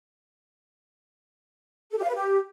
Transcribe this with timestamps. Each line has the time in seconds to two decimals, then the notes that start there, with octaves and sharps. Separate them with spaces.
1.92 A4
1.97 G4
2.03 F5
2.09 B4
2.15 G4